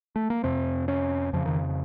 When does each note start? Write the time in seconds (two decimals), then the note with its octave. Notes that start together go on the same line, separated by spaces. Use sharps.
0.16 A3
0.30 A#3
0.44 F2 C3 C4
0.88 C#4
1.33 F2 C#3 F3
1.46 D#3